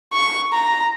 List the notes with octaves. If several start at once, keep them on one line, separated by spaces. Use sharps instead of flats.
C#6
A#5